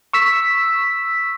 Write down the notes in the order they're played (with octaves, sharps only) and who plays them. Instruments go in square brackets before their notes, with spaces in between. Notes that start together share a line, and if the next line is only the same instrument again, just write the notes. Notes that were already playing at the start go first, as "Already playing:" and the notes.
[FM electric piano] C#6 E6 B6